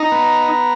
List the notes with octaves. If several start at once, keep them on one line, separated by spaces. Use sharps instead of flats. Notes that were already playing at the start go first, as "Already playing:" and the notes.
Already playing: D#4 A#5
B3